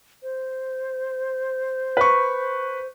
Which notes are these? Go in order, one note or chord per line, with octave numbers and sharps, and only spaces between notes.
C5
B4 C#6